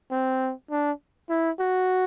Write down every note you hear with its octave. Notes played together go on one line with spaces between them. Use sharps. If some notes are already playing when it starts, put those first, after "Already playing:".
C4
D4
E4
F#4